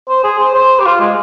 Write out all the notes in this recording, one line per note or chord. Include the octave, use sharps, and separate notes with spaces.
C5
G#4
C5
C5
G4
F4
G#3